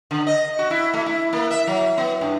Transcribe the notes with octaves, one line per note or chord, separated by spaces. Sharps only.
D3
D#5
F#4
E4
A3
E4
A#3
E5
F#3
B3
G2